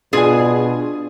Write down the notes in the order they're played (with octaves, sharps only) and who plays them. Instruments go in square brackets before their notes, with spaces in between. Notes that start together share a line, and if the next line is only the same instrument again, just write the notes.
[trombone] B2 [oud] D4 F4 [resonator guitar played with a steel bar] G#4 G#5